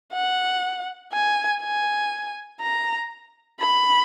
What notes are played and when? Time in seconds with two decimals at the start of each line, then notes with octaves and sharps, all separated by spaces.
0.13 F#5
1.13 G#5
1.61 G#5
2.61 A#5
3.60 B5